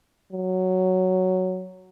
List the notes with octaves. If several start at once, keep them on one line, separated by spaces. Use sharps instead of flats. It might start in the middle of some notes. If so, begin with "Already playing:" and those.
F#3